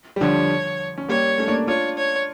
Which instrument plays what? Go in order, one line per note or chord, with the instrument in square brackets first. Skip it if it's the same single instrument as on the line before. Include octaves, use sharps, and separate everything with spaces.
[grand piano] G3
[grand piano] D3 F3 [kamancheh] C#5
[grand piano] C#4
[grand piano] G3 A#3 [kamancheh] C#5
[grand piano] A3 C#4
A#3 D4
[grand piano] D4 F4 [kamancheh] C#5
[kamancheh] C#5